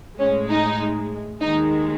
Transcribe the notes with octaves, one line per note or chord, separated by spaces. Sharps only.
A2 G#3 C#4
D#4
D#2 D#3 G#3 D#4